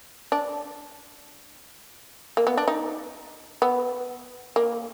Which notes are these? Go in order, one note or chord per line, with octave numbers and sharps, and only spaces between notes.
D4
A#3
B3
D4
D#4
B3
A#3